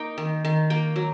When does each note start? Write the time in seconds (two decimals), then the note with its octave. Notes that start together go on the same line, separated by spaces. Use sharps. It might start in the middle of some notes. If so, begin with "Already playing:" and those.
Already playing: A#3 D#4 G5
0.18 D#3
0.45 D#3
0.70 A#3 G5
0.96 F#3